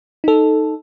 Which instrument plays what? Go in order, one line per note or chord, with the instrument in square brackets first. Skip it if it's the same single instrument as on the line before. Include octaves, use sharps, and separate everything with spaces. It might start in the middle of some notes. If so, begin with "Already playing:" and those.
[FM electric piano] D#4 A4